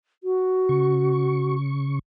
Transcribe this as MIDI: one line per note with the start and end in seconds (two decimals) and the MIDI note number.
0.23 1.56 66
0.69 1.99 49
0.69 1.99 85